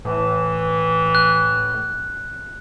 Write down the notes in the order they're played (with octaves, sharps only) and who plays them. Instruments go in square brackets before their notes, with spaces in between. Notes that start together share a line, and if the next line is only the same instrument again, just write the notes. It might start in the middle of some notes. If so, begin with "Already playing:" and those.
[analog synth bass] A2 [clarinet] E3
[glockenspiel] F#6